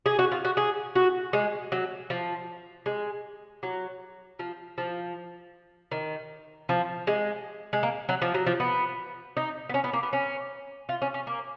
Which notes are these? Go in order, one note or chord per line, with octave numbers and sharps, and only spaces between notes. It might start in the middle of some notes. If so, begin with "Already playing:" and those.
G#4
F#4
F4
F#4
G#4
F#4
G#3
F#3
F3
G#3
F#3
F3
F3
D#3
F3
G#3
G#3
A#3
F#3
F3
F#3
F3
B3
D#4
B3
C#4
B3
A#3
B3
C#4
F4
C#4
C#4
A#3